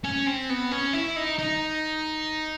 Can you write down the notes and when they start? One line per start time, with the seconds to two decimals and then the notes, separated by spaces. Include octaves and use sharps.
0.04 C#4
0.26 C4
0.49 B3
0.71 C#4
0.93 E4
1.16 D#4
1.38 D#4